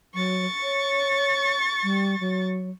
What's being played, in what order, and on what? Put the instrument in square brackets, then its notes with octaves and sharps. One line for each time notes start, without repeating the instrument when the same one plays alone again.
[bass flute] F#3 [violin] C#6 A6
[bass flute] C#5
G3
F#3